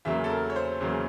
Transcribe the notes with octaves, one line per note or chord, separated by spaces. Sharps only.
E2 C#3 F#3 A#3 E5
A4
A#4
C#5
C5
E2 C#3 F#3 A#3